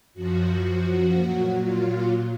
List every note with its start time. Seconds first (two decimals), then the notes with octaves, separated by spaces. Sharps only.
0.14 F#2 F3 F#4
1.12 A#2 F#3
1.61 F4